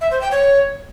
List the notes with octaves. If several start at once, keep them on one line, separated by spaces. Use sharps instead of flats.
E5
C5
G5
C#5